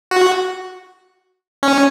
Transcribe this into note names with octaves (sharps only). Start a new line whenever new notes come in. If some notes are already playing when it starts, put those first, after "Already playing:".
F#4
C#4